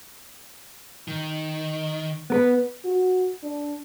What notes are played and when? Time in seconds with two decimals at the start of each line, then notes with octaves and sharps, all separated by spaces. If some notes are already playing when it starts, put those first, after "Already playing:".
1.08 D#3
2.30 B3 A#4 B4
2.85 F#4
3.43 D4